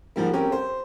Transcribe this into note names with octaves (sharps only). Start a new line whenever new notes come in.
G#2 F3 G3 A#3
C4 C#4 G4 A#4
C5